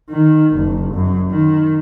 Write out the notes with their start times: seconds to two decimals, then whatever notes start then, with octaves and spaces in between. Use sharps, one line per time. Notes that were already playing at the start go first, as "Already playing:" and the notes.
0.10 D#3
0.54 F#1
0.94 F#2
1.30 D#3